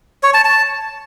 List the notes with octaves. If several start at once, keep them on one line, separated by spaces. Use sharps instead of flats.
C#5
A5
A5